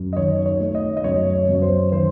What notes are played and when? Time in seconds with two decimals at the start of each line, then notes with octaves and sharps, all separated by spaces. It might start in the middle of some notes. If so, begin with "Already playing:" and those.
Already playing: F#2
0.13 D#5
0.16 D#3 C#5
0.46 C#5
0.60 A3
0.75 D#5
0.97 D#5
1.04 F#2 C#5
1.34 C#5
1.49 F#2
1.55 C#5
1.62 C5
1.92 D#3 C5